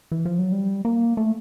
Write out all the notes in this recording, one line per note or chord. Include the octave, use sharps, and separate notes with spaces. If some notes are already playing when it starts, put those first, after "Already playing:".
E3
F3
F#3
G3
A#3
A3